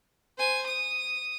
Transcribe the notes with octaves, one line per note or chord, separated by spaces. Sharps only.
C5 G#5
D#6